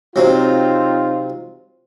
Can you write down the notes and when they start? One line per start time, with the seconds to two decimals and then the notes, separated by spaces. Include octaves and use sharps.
0.16 C3 F#3 C4 D#4 F4